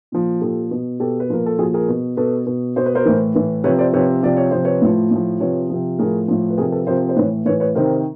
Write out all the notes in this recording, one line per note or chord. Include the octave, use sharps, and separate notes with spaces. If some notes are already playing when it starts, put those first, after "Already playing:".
A#2 F3
A#2 F3 G4 A4
B2
B2 G4 A4
B4
A#2 F3 A#4
A4
A#2 F3 F#4 G#4
G#4 A#4
B2
B2 A4 B4
B2
B2 C5
B4
A#4 C5
A2 E3
A2 E3
C3 F3 B4 C#5
C5 D5
C3 F3 B4 C#5
C3 F3 D5
C#5
C3 F3 C5
B4 C#5
A2 F3
A2 F3
C3 F3 B4 C#5
C3 F3
A2 F3 G#4 A#4
A2 F3
B4
C3 F3 G#4 A#4
A4 B4
C3 F3 A#4 C5
C5
A2 E3 B4 C#5
A2 E3 B4 C#5
B4 C#5
C3 D#3 A#4 C5